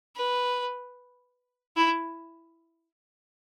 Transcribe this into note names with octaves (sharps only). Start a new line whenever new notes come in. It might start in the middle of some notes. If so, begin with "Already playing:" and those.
B4
E4